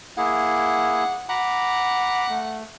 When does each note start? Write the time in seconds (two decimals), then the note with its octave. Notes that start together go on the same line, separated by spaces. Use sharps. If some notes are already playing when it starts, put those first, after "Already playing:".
0.17 A#3 E4 G#4 F#5
1.29 F#5 A#5 B5 D6
2.29 A3